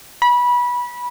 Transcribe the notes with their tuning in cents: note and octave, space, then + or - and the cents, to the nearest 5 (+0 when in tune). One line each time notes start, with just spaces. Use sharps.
B5 -20